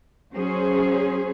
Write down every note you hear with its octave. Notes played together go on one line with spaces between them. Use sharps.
F#3 C#4 G#4 C5